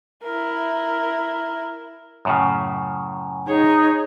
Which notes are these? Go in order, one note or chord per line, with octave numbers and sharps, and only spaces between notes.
E4 A#4
F#2 A2 C#3
D#4 G#4 C#5